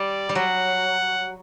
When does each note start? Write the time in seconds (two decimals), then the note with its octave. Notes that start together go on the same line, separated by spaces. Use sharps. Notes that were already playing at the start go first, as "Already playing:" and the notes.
Already playing: G3 D5
0.29 G3
0.35 F#3 F#5